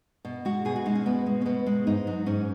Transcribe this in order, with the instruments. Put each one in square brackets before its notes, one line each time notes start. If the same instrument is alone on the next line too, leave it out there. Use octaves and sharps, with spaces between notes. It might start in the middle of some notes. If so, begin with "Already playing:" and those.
[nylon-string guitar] B2
G#3 F#4
B2 G#4
F#4
G#3 D#4
C#4
B2 B3
G#3
C#4
B2 B3
G#3
G#2 D#4
F#3
G#2 C#4